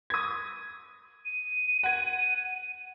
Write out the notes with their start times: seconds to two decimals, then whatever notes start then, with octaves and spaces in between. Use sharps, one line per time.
0.10 D#6 G#6
1.25 D#7
1.83 F#5 G#6